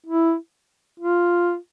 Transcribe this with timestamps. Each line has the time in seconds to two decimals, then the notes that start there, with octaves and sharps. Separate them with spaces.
0.06 E4
1.00 F4